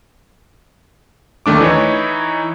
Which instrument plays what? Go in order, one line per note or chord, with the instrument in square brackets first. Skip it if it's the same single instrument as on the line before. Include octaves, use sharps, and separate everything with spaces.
[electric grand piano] D#2 D#3 A3 D4 D6
E3 D#4 E4 C#5